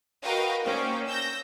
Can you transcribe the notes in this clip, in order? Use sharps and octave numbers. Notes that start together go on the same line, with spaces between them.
F#4 A#4 B4 D#5 F5 G5
A#3 C#4 D#4 C5 D5 G5
E6 G6 A#6